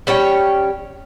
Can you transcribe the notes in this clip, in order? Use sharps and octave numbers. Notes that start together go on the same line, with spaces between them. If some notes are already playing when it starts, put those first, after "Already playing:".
G3 C#4 C#5 G5